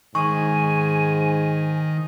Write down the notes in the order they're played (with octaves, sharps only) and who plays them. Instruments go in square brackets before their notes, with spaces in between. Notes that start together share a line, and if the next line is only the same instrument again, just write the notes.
[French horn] G#2 [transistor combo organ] D#3 [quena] G#5 [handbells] C#6